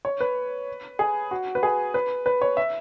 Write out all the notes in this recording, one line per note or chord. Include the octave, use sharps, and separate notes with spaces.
C#5
B4
G#4
F#4
B4
G#4
B4
B4
C#5
E5